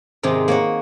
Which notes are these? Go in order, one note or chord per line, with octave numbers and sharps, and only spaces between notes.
G#2 C3 D#3 G#3
A#3 C#5 F#5